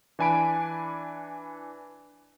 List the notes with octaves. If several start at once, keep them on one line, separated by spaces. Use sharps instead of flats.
E3 D4 G#5 B5 D7